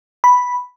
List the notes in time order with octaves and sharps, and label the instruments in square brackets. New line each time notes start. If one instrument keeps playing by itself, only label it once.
[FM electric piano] B5